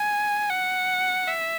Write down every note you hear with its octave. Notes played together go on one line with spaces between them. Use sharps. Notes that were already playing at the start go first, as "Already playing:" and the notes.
Already playing: G#5
F#5
E5